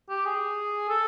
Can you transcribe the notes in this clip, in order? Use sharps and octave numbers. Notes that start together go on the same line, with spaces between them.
G4
G#4
A4